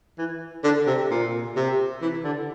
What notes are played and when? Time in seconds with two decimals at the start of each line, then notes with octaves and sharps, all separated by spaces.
0.18 E3
0.64 D3
0.86 C3
1.10 A#2
1.56 C3
2.01 E3
2.24 D3